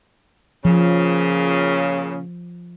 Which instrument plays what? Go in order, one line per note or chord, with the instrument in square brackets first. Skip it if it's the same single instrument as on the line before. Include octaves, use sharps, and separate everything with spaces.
[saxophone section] A#2 C#3 [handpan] F3